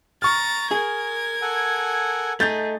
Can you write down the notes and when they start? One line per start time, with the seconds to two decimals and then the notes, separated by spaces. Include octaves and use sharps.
0.22 A#5 C#6 F6 A6
0.71 G#4 A#4 G#6
1.42 A4 F#5 G#5
2.40 A3 D#4 G#4 G6 A6